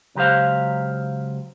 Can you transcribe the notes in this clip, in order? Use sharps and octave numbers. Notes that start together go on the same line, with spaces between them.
C#2 F#3 G4 C5 F5